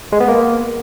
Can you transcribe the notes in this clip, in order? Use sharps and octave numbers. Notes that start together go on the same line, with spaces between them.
G#3
B3
A#3